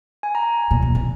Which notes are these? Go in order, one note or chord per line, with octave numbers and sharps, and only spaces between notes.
G#5
A#5
A#2
C3
E3